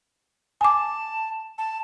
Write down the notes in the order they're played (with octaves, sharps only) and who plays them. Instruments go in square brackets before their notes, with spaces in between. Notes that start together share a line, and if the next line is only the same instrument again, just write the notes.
[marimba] G#5 D6 [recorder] A5
[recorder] A5